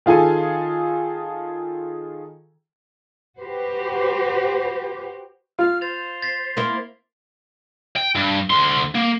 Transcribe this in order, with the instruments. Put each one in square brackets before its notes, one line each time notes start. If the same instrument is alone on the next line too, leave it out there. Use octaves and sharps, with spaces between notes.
[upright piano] D#3 F4 G#4 A4 G#5
[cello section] F#4 G4 B4 C5
[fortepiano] F4 [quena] F6
[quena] C5 [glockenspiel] A6 F7
[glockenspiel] A6 B6 C7
[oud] A#3 C4 E4
[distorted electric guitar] G5
G2
D2 C6
A#3